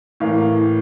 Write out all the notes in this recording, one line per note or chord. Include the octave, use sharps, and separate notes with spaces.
A2 E3 A#3 F5